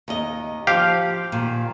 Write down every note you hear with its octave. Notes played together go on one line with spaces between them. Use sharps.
D#2 D#4 D#5
F3 G4 F5
A#2 D#3